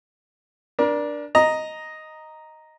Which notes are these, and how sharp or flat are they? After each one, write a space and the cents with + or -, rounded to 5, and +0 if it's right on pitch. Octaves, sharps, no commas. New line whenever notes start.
D4 +0 A#4 +35
D#5 +0 A#5 +0